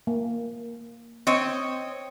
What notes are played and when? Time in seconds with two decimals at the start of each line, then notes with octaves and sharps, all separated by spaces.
0.07 A#3
1.27 C4 C#5 D#5